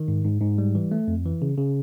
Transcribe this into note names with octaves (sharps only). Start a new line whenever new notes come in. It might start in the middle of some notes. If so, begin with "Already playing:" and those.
Already playing: D#3
G#2
G#2
G#2
G3
E3
A3
F2
E3
C#3
C#3